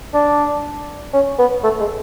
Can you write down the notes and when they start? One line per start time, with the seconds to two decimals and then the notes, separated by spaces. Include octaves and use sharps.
0.14 D4
1.13 C#4
1.39 B3
1.64 A3
1.80 G#3